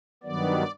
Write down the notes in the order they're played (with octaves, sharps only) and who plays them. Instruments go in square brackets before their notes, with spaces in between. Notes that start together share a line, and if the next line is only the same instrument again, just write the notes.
[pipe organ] G2 D#3 F#3 B3 D5